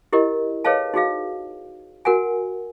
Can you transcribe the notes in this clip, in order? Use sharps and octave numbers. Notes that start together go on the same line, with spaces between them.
E4 G4 A#4 D#5
G#4 B4 C#5 D#5 F5 A5
D#4 F#4 G#4 F5
F#4 A#4 F#5 G#5